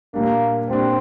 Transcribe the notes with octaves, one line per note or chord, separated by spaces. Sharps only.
A#2 G3 A#3 D4
A#2 G3 C4 D4